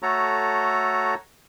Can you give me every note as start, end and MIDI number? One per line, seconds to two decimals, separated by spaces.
0.02 1.15 57
0.02 1.15 66
0.02 1.15 69
0.02 1.15 73
0.02 1.15 82